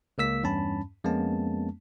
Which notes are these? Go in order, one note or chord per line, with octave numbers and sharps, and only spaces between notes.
C#2 A#3 E6 B6
E2 G2 C#4 A5 B5
F2 G#3 A#3 B3 C#4 A5